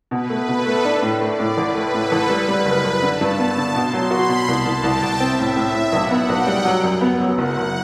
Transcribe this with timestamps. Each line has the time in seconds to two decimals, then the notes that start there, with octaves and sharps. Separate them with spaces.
0.11 B2 B4
0.30 A3
0.48 B2 A4
0.66 A3
0.85 D4
1.02 A2
1.21 A3 D5
1.39 A2
1.58 A1 B4
1.75 A3
1.94 A2 A4
2.12 A1
2.29 G3 B4
2.48 G3
2.66 F#1
2.84 F#1
3.02 D3 A5
3.21 G2
3.39 B3 A5
3.57 D3
3.75 B2 C6
3.94 F#3
4.11 F#4 B5
4.29 B2
4.48 C2 A5
4.66 C2
4.84 C2 G5
5.03 C2
5.20 C4 E5
5.39 A2
5.56 A2
5.75 A2
5.92 B1 F#5
6.11 B3
6.29 B1 G5
6.47 G3
6.65 F#3
6.84 F#2
7.01 B3
7.20 F#3
7.38 F#1 F#5
7.57 F#1